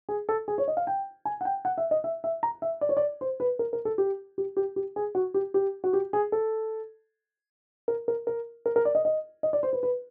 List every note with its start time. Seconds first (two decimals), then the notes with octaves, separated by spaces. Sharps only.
0.09 G#4
0.29 A4
0.48 G#4
0.58 C#5
0.68 D#5
0.77 F5
0.87 G5
1.25 G#5
1.41 F#5
1.45 G5
1.65 F#5
1.78 E5
1.91 D#5
2.04 E5
2.24 E5
2.43 A#5
2.62 E5
2.81 D5
2.89 C#5
2.97 D5
3.21 C5
3.40 B4
3.59 A#4
3.73 A#4
3.85 A4
3.98 G4
4.38 G4
4.57 G4
4.76 G4
4.96 G#4
5.15 F#4
5.34 G4
5.54 G4
5.84 F#4
5.93 G4
6.13 G#4
6.32 A4
7.88 A#4
8.08 A#4
8.27 A#4
8.66 A#4
8.76 A#4
8.85 D5
8.95 D#5
9.05 D#5
9.43 D#5
9.53 D5
9.63 C5
9.73 B4
9.83 B4